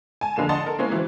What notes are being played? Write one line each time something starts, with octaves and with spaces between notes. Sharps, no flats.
G#5 A5
F2 D3 G#3 A#3 G#5 E7
D5 D#5 F#5 A5 C6 A6
A4 A#4
G#3 A#3 C4 C#4 E4
E3 F#3 C4